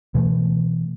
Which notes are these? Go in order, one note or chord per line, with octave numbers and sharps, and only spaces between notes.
B2 E3 A3